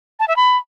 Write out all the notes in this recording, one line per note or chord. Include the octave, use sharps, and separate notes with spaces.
A5
E5
B5